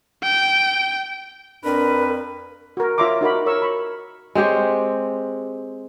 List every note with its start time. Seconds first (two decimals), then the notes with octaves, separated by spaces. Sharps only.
0.23 G5
1.64 F2 D4 A#4 B4
2.77 F#4 A#4
2.98 F4 C#5 E5 A#5 C6 D6
3.21 D#4 F#4 A#4 B5
3.46 A#4 C#5 C#6 E6
3.62 B5 C#6
4.35 G#3 C4 G4 C#5